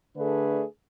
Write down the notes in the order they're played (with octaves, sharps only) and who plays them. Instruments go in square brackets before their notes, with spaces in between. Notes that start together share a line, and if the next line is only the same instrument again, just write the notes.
[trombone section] D3 A3 D4 G#4 B4